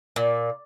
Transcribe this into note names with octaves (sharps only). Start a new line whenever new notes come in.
A#2